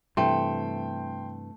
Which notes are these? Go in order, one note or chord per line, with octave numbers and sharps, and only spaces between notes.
G2 C3 E3 A3 G5 C6